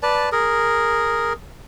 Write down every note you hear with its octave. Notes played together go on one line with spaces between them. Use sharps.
B4 D5 A5
G#4 A#4